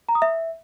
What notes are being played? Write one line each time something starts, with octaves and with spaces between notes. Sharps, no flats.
A#5
D#6
E5